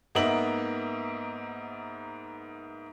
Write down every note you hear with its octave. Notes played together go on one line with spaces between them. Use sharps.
G#2 A#3 B3 D#5 E5 F#7